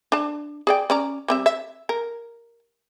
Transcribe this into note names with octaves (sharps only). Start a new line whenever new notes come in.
D4 A5
G#4 D5 G5
C#4 D5 A#5
G3 C4 E5
E5
A#4